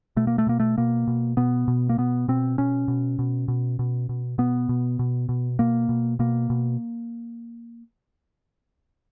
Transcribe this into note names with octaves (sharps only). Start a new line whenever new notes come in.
B2 A3
A#3
A3
B2 A#3
A3
B2 A#3
B2
B2 B3
B2
A#3
B2 B3
B2 C4
B2 C#4
B2
B2
B2
B2
B2
B2 B3
B2
B2
B2
B2 A#3
B2
B2 A#3
B2